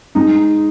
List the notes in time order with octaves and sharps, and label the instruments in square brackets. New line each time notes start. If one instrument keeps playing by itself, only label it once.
[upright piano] G#3 D#4